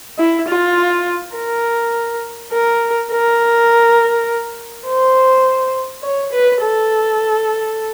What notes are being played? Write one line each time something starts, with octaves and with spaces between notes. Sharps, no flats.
E4
F4
A#4
A#4
A#4
C5
C#5
B4
A4